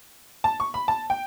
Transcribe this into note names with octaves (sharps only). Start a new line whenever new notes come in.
A5
C#6
B5
A5
G5